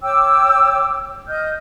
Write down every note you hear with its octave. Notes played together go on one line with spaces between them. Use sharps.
C#5 G5 D6 E6
D#5 F6 G6